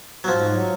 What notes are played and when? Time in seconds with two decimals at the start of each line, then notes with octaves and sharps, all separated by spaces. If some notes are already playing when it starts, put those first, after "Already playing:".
0.24 F#3
0.28 G#2 F3
0.49 F#3